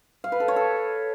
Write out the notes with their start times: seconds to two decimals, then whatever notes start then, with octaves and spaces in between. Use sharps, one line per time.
0.24 F5
0.32 B4
0.40 A4
0.48 C#5
0.56 A4